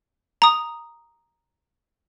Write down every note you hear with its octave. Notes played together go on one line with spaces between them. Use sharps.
A#5 D#6